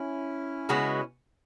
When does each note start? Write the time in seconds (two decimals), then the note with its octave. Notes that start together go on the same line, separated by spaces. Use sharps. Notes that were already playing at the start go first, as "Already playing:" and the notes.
Already playing: C#4 E4
0.69 C#3 G#3 B3 F#4